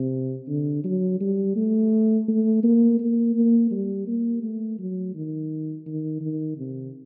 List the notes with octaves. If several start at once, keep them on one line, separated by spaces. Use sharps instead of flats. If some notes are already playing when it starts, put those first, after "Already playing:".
Already playing: C3
D3
F#3
G3
A3
A3
A#3
A#3
A#3
G3
A#3
A3
F#3
D#3
D#3
D#3
C3